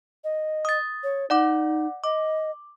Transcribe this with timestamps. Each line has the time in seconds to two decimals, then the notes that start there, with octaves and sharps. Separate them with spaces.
0.24 D#5
0.65 D#6 A6
1.03 C#5
1.30 D#4 D5 F#5 D6
2.04 D#5 D6